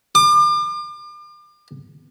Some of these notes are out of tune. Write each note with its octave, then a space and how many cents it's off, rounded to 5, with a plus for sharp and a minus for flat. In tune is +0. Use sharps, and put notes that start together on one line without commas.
D6 +35